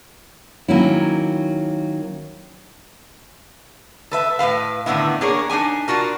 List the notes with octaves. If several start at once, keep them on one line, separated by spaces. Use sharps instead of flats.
D#3 F#3 A#3 C#4 E4
A4 B4 E5
A2 A3 B4 F5
A2 D3 D#3 B3 E4
A#3 D4 G#4 A#4 C#5
D4 D#4 G4 G#5
D4 F4 F#4 A#4